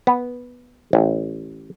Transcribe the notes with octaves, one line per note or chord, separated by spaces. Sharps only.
B3
A1